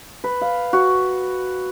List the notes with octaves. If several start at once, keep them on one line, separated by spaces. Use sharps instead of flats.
B4
F5
F#4